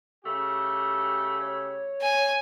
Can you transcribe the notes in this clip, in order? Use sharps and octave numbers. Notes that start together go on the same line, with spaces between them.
C#3 A3 G4
C#5
G#5